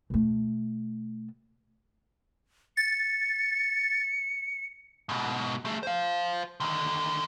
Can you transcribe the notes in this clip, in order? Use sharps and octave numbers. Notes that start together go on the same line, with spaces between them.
B2 A3
A6 C#7
G#2 B2
A3 G#4
C5 F5
D3 D#3